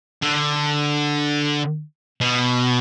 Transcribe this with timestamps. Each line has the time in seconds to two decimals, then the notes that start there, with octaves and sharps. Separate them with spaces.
0.22 D3
2.21 B2